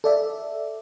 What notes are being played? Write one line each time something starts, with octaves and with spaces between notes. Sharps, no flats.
A4 D5 E5